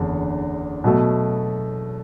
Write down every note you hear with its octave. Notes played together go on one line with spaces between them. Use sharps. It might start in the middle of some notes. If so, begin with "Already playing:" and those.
Already playing: F#1 E2 D3 D4
B2 F#3 A3